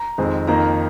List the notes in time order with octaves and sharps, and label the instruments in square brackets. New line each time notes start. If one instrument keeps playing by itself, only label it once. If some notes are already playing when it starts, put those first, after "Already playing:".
Already playing: [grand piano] A#5
F2 D#3 G#3 C4
F2 D#3 A#3 A#5